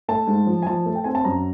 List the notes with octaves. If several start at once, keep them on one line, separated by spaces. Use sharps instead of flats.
A3 A5
G#2
F3
G#5
F3 A5
A3
G5
C4 G#5
A5
F#2 A#5